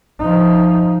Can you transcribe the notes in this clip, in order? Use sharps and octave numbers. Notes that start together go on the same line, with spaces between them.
F3 D#4